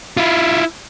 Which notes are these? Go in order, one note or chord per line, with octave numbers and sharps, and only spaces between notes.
E4 F4